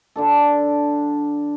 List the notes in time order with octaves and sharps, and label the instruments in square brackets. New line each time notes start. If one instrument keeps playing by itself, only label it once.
[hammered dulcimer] D3 D4 A4